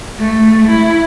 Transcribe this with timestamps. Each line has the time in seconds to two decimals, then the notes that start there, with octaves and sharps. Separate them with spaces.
0.18 A3
0.67 E4